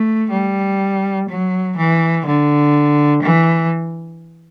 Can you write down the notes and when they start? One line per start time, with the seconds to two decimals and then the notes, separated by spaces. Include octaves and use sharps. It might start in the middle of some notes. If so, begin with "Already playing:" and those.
Already playing: A3
0.31 G3
1.29 F#3
1.77 E3
2.26 D3
3.22 E3